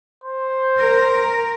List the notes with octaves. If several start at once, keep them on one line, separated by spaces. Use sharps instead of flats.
C5
A#4